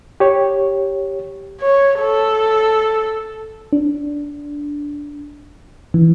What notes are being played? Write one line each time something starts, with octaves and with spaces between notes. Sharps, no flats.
G4 C#5
C#5
A4
D4
E3